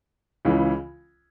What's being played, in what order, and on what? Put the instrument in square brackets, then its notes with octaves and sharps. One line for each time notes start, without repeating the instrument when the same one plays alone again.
[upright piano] C#2 C#3 E3